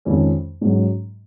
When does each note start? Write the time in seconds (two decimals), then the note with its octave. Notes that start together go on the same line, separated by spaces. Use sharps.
0.05 F2 D#3 G#3 C#4
0.61 G#2 F#3 C#4